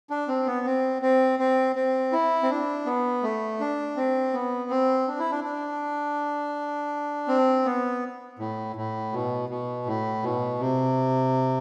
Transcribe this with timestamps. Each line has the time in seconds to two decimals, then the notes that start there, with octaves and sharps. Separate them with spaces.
0.10 D4
0.28 C4
0.47 B3
0.66 C4
1.02 C4
1.39 C4
1.76 C4
2.12 E4
2.43 C4
2.50 D4
2.86 B3
3.23 A3
3.60 D4
3.97 C4
4.33 B3
4.70 C4
5.08 D4
5.19 E4
5.31 D4
5.44 D4
7.28 C4
7.65 B3
8.39 A2
8.76 A2
9.12 B2
9.49 B2
9.86 A2
10.23 B2
10.59 C3